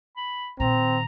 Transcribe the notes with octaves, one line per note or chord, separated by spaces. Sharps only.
B5
A#2 D#3 C4 A#5